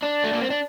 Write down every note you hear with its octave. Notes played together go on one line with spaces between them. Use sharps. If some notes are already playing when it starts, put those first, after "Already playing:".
D4
A3
A#3
C4
D4